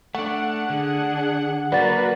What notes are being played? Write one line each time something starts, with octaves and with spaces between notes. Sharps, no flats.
A3 D4 F#5
D3 D4 G#4
F#3 A#3 F#4 A#4 B4 D5 F#5 A6